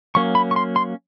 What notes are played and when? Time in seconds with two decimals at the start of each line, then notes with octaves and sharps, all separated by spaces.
0.15 F#3 A#3 C#4 C#6
0.35 B5
0.51 C#6
0.56 C6
0.76 C6